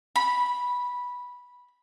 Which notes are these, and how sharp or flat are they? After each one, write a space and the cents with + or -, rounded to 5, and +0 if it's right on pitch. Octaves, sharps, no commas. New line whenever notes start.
B5 -10